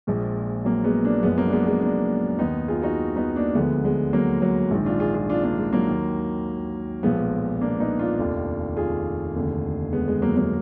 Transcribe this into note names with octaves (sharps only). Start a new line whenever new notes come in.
A#1 A#2 F3 G#3
F#3 A#3
G#3 B3
A#3 D4
F#1 F#2 F3 G#3 B3
F#3 A#3
D4
G#3 B3
G#3 B3
A#3 D4
D#2 D#3 B3 D#4
F4 G#4
D#4 F#4
B3 D#4
A#3 D4
D2 D3 F3 G#3 B3
G#3 B3
F#3 A#3
F#3
A#1 G#2 D#3 G#3
D4 F4
F4 G#4
F4 G#4
D4 F4
A#3 D4
G#3
F#3 A#3
D#2 D#3
B1 A#2 F3 G#3 B3
A#3 D4
B3 D#4
D4 F4
F1 D#2 D#3
F4 G#4
F1 D#2 D3
G#3 B3
G#3
F#3 A#3
F#3 A#3